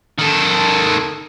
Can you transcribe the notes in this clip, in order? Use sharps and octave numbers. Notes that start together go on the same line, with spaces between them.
D#3 A4